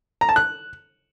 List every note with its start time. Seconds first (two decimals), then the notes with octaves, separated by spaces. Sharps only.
0.21 A#5
0.29 A5
0.36 F#6